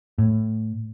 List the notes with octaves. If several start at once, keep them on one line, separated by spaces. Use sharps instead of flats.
A2